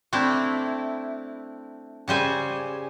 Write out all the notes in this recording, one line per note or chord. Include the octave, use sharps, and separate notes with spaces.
A3 C4 D4 E4
C#3 G3 C5 G#5